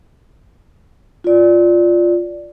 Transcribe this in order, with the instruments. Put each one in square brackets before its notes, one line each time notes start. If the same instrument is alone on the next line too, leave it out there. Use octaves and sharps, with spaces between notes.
[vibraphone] F4 D5